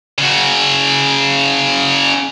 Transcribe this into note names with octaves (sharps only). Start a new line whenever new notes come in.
C#3 F#4